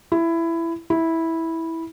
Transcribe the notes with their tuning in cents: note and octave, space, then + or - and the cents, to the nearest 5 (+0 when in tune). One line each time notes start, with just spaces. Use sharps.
E4 +15
E4 -10